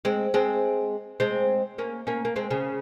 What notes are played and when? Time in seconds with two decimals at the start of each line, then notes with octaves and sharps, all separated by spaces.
0.05 G#3 C4
0.34 G#3 C4
1.20 G#3 C4
1.78 A#3 C#4
2.07 A#3 C#4
2.25 A#3
2.36 G#3 C4
2.50 C#3